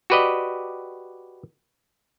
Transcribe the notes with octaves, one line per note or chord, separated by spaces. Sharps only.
F#4 G4 B4 D5 D#5